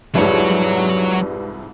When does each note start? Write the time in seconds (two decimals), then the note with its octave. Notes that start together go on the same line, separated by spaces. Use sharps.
0.15 C2 F2 G#2 F#3 G4 B4 C#5 D5